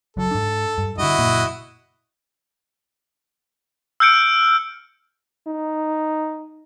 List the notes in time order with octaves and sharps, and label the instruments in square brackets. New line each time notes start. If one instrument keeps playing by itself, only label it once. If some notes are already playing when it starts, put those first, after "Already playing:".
[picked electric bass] F#1 F#2 F#3 [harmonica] A4
[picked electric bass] G#2 D4
G2
[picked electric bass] G2 D3 [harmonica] E4 F#4 D#5
[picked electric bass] F#1 A#2 A#3
[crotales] E6 F6 G6 C#7 D7
[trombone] D#4